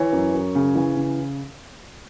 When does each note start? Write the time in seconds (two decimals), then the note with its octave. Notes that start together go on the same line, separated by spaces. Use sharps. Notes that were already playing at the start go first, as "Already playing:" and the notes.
Already playing: E3 C#5
0.12 F#2
0.34 F#2
0.55 C#3
0.75 E3
0.96 C#3